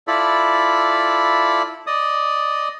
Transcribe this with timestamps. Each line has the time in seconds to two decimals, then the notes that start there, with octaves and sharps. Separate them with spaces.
0.07 E4 F4 A4 D5 B5
1.87 D5 D#5 D#6